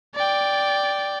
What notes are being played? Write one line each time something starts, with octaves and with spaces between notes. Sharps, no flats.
D5 G5